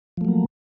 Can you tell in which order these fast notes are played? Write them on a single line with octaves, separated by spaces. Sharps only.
F3 A3 F#3 A#3